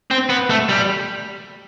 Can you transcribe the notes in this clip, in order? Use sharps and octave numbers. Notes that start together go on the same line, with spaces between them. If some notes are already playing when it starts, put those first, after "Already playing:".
C4
B3
A3
G3